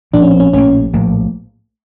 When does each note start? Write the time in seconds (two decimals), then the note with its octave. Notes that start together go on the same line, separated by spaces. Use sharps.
0.14 A#1 A2 F3 A#3 D4
0.22 C#4
0.31 C4
0.40 C#4
0.53 A#1 A2 F3 A#3 C#4
0.93 A#1 A2 F3 A#3